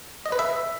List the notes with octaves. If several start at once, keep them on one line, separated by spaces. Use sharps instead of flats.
D#5
B4
E5